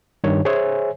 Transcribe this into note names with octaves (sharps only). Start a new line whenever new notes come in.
G2 D#3 C#5
G#4 C5 C#5 E5 G#5